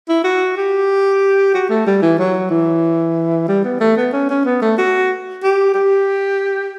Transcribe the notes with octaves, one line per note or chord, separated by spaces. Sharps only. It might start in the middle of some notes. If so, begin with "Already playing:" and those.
E4
F#4
G4
F#4
A3
G3
E3
F#3
E3
G3
B3
A3
B3
C#4
C#4
B3
A3
F#4
G4
G4